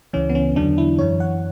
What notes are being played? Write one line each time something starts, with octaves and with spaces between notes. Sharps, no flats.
C#2 C#3 E3 C#4
B3
C#4
E2 D3 F#3 D4
E4
F#2 E3 C#5
F#5